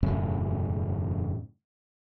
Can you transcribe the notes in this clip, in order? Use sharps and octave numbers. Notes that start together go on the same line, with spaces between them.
E1 F#2 A2 C#3